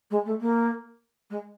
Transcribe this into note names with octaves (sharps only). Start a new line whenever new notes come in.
G#3
A3
A#3
G#3